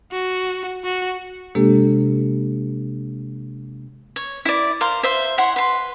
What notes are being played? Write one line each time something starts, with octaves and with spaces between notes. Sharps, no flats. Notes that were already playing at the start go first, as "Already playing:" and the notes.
F#4
F#4
C3 G#3 A#3 D4 G4 A4
C#5
E4 D5
A#4 C5 F5
C5 E5 F5
E4 C#5 F#5 C6
B4 C6